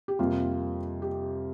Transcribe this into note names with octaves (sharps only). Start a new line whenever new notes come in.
G4
F2 C3 G3 A#3 F4
G4